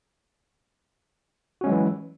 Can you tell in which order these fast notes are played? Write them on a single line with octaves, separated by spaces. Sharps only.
F#4 C#4 G#3 F#3 E3